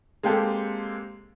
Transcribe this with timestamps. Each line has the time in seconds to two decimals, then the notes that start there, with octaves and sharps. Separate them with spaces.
0.23 G#3 A#3 C4 G4 A4